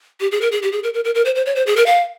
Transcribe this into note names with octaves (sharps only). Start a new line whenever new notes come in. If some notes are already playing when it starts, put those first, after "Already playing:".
G4
G#4
A#4
G#4
G4
G#4
A#4
A#4
A#4
A#4
C5
C5
C#5
C5
G#4
A#4
F5